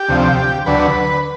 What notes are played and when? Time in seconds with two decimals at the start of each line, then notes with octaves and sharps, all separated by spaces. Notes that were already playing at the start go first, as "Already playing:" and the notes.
Already playing: G4
0.09 D2 C3 F3
0.66 D2 D3 F#3 B4